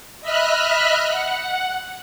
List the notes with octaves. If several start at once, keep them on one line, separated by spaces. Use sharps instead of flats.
D#5 E5 B5 F6 F#6
F#5